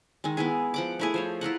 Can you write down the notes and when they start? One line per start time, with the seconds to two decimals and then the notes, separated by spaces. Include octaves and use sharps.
0.24 D#3 G#3
0.37 B3 E4 G#4
0.74 F3 F#5 D6
0.99 A3 E4 G#4
1.14 F3 C5 C#5
1.41 E4 F4 A#4 F#5